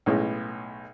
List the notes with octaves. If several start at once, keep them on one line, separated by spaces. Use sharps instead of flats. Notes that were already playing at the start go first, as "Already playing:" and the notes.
B1 A2 G#3 C#4